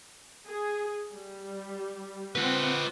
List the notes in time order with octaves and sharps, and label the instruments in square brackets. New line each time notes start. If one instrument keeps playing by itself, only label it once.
[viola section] G#4
G3
[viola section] C4 F#5 [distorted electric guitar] F4 B4